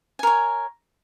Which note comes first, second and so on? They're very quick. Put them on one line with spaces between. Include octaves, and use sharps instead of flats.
G#5 A#4 C#5